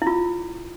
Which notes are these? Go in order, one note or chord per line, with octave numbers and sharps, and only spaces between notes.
E4
F4